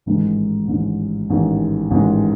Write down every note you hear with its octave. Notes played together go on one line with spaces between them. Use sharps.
A1 G#2 D#3 G#3
A1 G#2 D#3 G#3
A1 G#2 D#3 G#3
A1 G#2 D#3 G#3